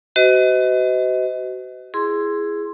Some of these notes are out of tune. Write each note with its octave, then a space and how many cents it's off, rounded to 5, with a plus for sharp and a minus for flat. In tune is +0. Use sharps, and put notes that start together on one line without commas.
F#4 +30 C5 -45 D#5 +25
E4 +15 G#4 +0 C6 +0